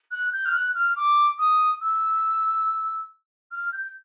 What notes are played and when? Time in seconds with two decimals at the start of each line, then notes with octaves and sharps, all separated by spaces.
0.11 F#6
0.33 G6
0.46 F6
0.53 F#6
0.75 F6
0.96 D6
1.39 D#6
1.81 E6
3.51 F6
3.72 G6